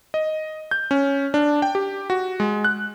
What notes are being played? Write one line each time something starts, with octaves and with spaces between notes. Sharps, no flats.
D#5
G6
C#4
D4
G5
G4
F#4
G#3
F#6